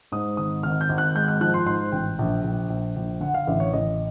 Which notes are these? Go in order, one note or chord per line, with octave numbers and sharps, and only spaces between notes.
G#2 D#6
G#1 D#6
G#1 F6
G6
G#1
F#6
G#3 G6
F#6
F3 F#6
C6
G#2 C6
A1 G5
A#1
A#1
A#1
A#1
D3 F#5
F5
A1 E5
C#5
A1 D#5